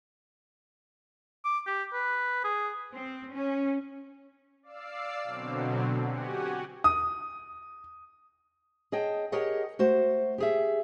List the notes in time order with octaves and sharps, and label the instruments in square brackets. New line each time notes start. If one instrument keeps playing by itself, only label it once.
[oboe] D6
G4
B4
G#4
[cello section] C4
C#4
[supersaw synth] D5 F5 D6 E6 C7
B2 D3 F#3 C4
F#4 G4 F#5 G#5
[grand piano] D#6
[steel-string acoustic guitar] G#4 C#5 D#5 G5 A5
G4 G#4 A#4 C#5 D#5 F#5
A3 F#4 C5
G4 G#4 E5